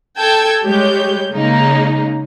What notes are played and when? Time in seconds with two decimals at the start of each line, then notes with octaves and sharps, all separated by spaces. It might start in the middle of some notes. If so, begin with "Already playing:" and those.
0.18 A4 G5 A5 E6 G#6
0.65 G3 G#3 G4 C#5 G6
1.31 C#3 G#3 A#3 D#4